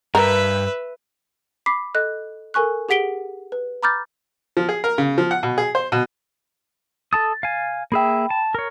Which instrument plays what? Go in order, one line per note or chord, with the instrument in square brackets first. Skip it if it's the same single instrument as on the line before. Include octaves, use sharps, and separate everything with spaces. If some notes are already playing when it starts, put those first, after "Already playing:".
[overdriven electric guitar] G2 [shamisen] A#4 [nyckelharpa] B4 E5
[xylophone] B5 D6 B6 C7
A4 D#5 F#6
A4 A#4 G#5 C#6 F#6
G4 G#4 F#5 B6 D7 G7
B4
A#5 B5 D6 F6 G6 A6
[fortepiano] F3
G#4
A#4
C#3
F3
F#5
B2
G#4
C5
B2
[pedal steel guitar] A4 A5 D#6 [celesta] A6
[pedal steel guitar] F5 G#5
[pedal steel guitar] A#3 G#4 E5 [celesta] G5 B5
[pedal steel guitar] A5
A#4 C#5